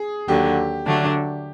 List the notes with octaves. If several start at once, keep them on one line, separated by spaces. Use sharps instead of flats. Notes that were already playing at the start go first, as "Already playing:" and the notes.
Already playing: G#4
D#2 D3 F#3 G4
D3 F#3 A3 D4